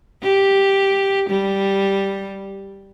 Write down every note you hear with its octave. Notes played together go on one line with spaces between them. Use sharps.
G4
G3